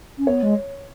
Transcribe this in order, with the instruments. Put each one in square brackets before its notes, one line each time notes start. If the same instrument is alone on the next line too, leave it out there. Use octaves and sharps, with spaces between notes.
[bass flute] C#4
[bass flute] B3 [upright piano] C#5
[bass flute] G#3